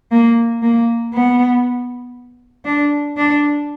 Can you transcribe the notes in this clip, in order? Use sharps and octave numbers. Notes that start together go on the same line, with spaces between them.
A#3
A#3
B3
D4
D4